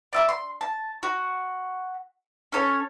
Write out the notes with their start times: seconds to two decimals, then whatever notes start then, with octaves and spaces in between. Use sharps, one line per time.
0.13 D5 E5 D6
0.29 C6
0.61 A5
1.03 F#4
2.52 C#4 A4 C#5